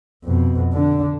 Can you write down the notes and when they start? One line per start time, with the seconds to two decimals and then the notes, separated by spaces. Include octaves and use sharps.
0.24 F2 B2
0.73 D3 D4